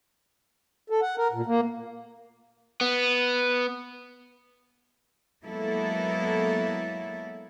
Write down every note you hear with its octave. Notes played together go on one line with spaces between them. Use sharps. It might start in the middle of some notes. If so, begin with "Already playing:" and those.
A4
F#5
A#4
A#2
A#3
B3
F#3 G#3 A#3 B3 E4 A4